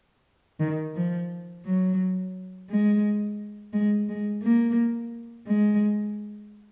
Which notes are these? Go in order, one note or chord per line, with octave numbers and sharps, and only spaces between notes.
D#3
F3
F#3
G#3
G#3
G#3
A#3
G#3